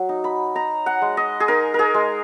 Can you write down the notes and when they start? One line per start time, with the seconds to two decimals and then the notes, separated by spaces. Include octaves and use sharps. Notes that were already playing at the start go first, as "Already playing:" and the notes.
Already playing: F#3
0.09 D#4
0.24 B5
0.55 D#4 A#5
0.86 F#5
1.02 G#3
1.17 D#5
1.40 G#4
1.48 D#4 A#4
1.74 G#4 A#4
1.94 G#3